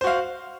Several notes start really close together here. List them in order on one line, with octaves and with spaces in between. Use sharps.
C5 F#4 F5